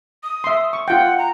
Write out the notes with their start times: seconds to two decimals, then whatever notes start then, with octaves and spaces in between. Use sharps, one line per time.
0.23 D#6
0.44 E5 C6
0.73 C#6
0.88 F4 F#5 G5
1.18 A#5